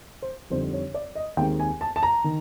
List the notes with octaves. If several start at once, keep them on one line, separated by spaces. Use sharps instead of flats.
C5
F2 D3 G3 C4 D#4 C5
C#5
D5
D#5
D#2 D#3 G#3 C4 G5
G#5
A5
A5
A#5
D#3